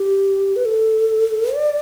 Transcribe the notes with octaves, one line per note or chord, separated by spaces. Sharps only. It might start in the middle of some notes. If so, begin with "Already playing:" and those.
Already playing: G4
B4
A4
D5